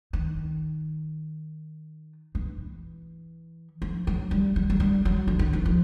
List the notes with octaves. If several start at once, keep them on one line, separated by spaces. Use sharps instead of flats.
D#3
E3
F3
F#3
G3
F#3
F#3
G3
F#3
D3
D#3
E3
F3